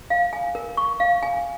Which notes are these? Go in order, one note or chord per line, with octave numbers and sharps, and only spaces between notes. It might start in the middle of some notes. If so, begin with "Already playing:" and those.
F5
G#5
A#4
C#6
F5
G#5